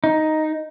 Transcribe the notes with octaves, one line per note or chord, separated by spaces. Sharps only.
D#4